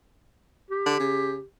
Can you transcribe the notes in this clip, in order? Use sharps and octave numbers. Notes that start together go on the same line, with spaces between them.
G4
D3
C#3